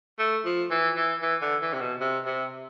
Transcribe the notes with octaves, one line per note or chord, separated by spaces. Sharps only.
A3
F3
E3
E3
E3
D3
E3
C3
B2
C3
C3